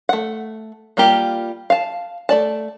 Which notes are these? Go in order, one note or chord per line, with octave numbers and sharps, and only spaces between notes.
A3 F#5
G3 A#3 F4 G4
F5 A5
A3 D5 A5